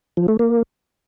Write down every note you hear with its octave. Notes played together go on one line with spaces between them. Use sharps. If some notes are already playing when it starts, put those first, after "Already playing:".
F3
A3
A#3